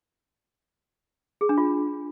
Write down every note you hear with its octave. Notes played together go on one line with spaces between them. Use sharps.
G#4
D4
F4